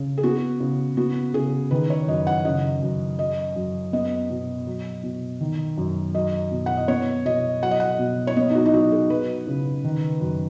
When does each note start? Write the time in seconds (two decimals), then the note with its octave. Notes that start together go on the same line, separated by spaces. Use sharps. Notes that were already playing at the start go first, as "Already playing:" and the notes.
Already playing: C#3
0.18 G#4
0.23 B3 F#4
0.60 C#3
0.97 B3 F#4
1.34 C#3 G#4
1.71 D#3 B4
1.90 C#5
2.08 F#2 D#5
2.27 F#5
2.45 C#3 D#5
2.83 F#2
3.19 F#3 D#5
3.56 F#2
3.93 B3 D#5
4.30 B2
4.67 F#3
5.04 B2
5.41 D#3
5.78 F#2
6.15 F#3 D#5
6.52 B2
6.66 F#5
6.77 D#5
6.88 B3 C#5
7.25 B2 D#5
7.63 F#3 F#5
7.71 D#5
7.80 F#5
7.99 B2
8.27 C#5
8.36 B3 D#5
8.50 D#4
8.55 F#4
8.66 D#4
8.73 F#3 F#4
8.92 G#4
9.10 F#3 B4
9.47 C#3
9.84 D#3
10.21 F#2